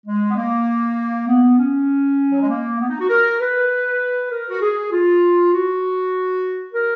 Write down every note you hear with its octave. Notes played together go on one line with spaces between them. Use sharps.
G#3
B3
A#3
B3
C#4
F#3
G#3
A#3
B3
D#4
F#4
A#4
B4
A#4
F#4
G#4
F4
F#4
A#4